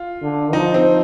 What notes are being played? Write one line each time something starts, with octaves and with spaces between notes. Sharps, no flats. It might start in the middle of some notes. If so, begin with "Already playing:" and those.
Already playing: F4
D3
F3 D#4
C4